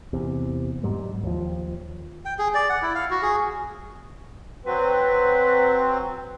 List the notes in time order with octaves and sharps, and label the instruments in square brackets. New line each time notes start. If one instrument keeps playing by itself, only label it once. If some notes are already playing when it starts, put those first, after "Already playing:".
[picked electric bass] E2 C3
G#2 F#3 G3
D#2 F3
[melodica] G5
G#4
D5
F#5
E4
F5
F#4
G#4
[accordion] F#3 C4 [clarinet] B4